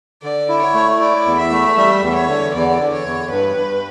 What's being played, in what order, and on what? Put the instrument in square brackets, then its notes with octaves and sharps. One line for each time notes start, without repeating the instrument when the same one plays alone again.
[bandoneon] D3 [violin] D5
[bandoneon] E4
[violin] C#5
[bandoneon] A3
[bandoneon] E4 [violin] D5
[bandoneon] E2
[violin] E5
[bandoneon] A3
[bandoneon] G3 [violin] E5
[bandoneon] E2
[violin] C#5
[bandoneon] D3
[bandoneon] E2 [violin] D5
[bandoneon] D3
[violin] C#5
[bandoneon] E2
[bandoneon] G2 [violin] B4
[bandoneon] G2